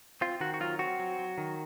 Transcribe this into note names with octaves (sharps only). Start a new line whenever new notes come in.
C4 F4
D#3 F#4
F#4
F#3 F4
C4 F#4
F#3
F#3
D#3